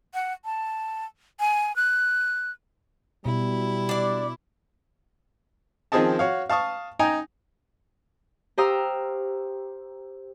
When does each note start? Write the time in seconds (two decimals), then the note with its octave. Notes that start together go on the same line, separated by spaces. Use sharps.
0.14 F#5
0.45 A5
1.40 G#5
1.76 F#6
3.26 B2 G3 E4
3.89 D4 D5
5.92 D#3 F3 C4 G#4 D#5 A5
6.19 F#4 C#5 F5
6.50 F5 A5 C#6 D#6
6.99 D#4 G5 G#5 A#5
8.58 G4 C5 F5 A#5 D#6 E6